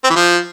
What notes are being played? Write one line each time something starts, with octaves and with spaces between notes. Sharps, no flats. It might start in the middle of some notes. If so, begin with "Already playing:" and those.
C4
E3
F3